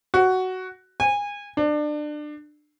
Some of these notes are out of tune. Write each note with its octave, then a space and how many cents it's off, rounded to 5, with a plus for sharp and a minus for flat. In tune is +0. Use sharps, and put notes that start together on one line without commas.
F#4 +10
G#5 -25
D4 +25